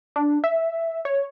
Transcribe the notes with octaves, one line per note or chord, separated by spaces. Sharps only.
D4
E5
C#5